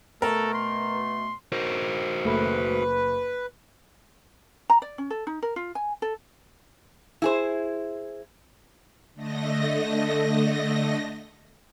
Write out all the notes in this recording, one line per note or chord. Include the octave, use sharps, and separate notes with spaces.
B2 A3 A4 A#4
C6
F#4 A#4 C5
F#1 A3 B4
A#5
D5
C#4
A4
D#4
A#4
F4
G#5
A4
E4 G#4 C5
D3 A3 D#5 A#6